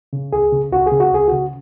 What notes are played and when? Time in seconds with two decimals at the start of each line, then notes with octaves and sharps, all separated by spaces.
0.13 C#3
0.33 C#2 G#4
0.52 C#3
0.73 C#2 F#4
0.86 G#4
0.92 C#3
1.00 F#4
1.12 C#2 G#4
1.28 C#3 F#4